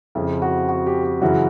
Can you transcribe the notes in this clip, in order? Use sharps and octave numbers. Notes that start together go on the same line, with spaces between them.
F2 C#3 F3 E4
F#4
F#4
G4
G4
F#2 C#3 E3 F#4